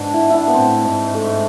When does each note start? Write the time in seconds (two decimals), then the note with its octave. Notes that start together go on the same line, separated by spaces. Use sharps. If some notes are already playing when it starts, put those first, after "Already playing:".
Already playing: G#2 B3 D4
0.14 E4
0.30 D4 E4
0.48 B3
0.54 A2 C4
0.84 G#2
1.15 A3